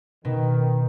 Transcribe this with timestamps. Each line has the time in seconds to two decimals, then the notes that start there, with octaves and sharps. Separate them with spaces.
0.25 B2 D#3